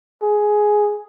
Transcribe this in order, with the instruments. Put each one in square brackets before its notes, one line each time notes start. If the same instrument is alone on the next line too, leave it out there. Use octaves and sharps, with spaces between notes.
[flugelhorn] G#4